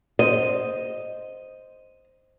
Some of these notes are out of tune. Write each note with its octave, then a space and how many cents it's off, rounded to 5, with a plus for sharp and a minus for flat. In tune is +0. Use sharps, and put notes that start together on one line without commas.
C5 +0 D#5 +0